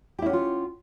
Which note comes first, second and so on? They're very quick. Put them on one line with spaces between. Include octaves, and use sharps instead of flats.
G4 E4 C#4 F#5 F4